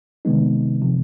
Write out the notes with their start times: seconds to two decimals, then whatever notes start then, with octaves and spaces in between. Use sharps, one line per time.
0.25 C3 D#3 G#3 B3 D#4
0.82 C3 F3